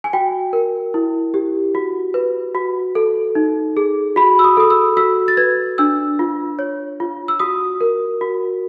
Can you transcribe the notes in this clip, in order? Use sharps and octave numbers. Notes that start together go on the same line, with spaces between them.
G#5
F#4 G5
A#4
E4
G4
F#4
B4
F#4
A4
D#4
G#4
F#4 B5
E6
D#6
A4 D#6
E6
F#4 E6
A6
B4 G#6
D4 E6
F4
C#5
F4
E6
F#4 D#6
A#4
F#4